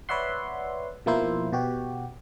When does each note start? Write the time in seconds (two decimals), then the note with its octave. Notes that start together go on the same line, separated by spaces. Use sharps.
0.09 B4 C#5 D5 E5 F#5 C6
1.06 B2 F3 A#3 E4 C5
1.53 B2 F#4 G4